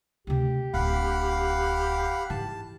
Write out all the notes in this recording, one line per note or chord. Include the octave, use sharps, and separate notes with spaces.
D2 C3 G4
D1 D4 F5 F#5 B5
G#2 E3 A5